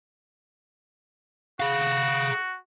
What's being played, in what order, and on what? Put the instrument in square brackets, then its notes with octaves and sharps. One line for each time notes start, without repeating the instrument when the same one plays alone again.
[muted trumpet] F#4 [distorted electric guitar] G#4 F5